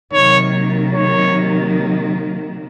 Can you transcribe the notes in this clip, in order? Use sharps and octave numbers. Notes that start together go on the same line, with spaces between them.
C3 D#3 F#3 A#3 C#5
C#5